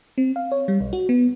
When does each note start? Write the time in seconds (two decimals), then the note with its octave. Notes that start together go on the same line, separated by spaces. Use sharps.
0.18 C4
0.36 F5
0.52 C#5
0.68 G3
0.81 B1
0.93 F#4
1.09 B3